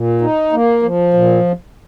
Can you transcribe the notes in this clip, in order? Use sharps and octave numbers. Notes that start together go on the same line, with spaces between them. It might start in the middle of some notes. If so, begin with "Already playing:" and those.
Already playing: A#2
D#4
A#3
F3
A#2